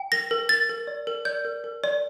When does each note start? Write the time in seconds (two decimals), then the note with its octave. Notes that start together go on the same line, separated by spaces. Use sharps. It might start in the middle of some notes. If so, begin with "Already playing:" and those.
Already playing: G5
0.12 A#4 A#6
0.31 A#4
0.49 A#4 A6
0.69 A#4
0.87 D5
1.07 A#4
1.25 D5 G6
1.45 A#4
1.64 A#4
1.84 D5